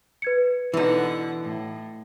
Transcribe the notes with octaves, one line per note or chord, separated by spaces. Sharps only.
B4 G#6 C#7
B2 D3 E3 D#4 F#5
A2